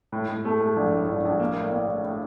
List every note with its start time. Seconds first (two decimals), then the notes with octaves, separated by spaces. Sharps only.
0.12 A2
0.29 A2
0.45 A3
0.60 A3
0.76 A#1
0.92 A2
1.09 A#1
1.25 A#1
1.40 A#3
1.56 A2
1.72 A#3
1.88 A2
2.04 A2